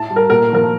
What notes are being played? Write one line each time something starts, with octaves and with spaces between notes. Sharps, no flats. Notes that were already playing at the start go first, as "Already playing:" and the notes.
Already playing: A2 A5
G3
A#4
A#2 A#4
F3 A3 A#4